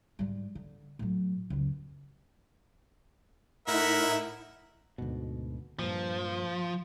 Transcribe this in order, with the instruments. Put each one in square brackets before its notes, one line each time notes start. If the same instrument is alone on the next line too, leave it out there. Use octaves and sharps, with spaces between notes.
[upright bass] G#2 G3
D3
A2 F#3
C#2 F#2
[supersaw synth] A2 D#4 E4 [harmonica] A#4 E5 F#5
[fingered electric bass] D2 G#2 B2
[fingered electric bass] G2 A#2 [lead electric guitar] F3